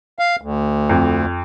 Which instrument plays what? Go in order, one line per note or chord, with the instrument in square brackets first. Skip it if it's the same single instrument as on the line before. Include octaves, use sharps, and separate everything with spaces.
[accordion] F5
D2
[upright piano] F2